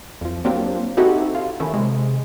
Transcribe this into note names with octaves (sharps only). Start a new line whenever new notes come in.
F2 F3
F#3 A#3 C4 D4 F4 G4
C4 D#4 E4 F#4 G4 A4
F4
D#3 A3 C#4 E4
C3 G#3